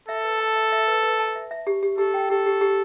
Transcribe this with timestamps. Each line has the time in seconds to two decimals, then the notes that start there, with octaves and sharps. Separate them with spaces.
0.08 A4 E5
0.24 B4
0.40 A5
0.56 E5
0.72 E5
0.88 B4
1.03 B4
1.19 A5
1.36 E5
1.51 E5
1.67 G4
1.83 G4
1.98 G4 A4
2.14 G5
2.30 G4 A4
2.46 G4
2.61 G4